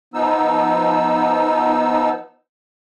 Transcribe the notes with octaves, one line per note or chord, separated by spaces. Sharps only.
F3 B3 D#4 E6